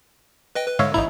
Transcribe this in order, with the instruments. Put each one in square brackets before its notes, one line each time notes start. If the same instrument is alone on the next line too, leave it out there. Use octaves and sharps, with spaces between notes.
[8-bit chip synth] B4 D#5 G5
B4
[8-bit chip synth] G#2 D3 G#3 [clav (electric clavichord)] C#5 E5 F5
[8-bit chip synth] A1 G#2 A#5 [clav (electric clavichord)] D#4 E4